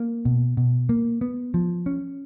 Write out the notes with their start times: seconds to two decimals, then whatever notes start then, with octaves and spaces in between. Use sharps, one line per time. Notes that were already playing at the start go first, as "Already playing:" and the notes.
Already playing: A#3
0.25 B2
0.57 B2
0.89 A#3
1.21 B3
1.54 F3
1.86 C#4